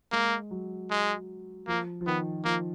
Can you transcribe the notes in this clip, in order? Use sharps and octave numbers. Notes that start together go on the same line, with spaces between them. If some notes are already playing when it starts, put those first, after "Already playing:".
G#3 A#3
F#3
G#3
F3 A#3
F3
D#3 B3
F3 A#3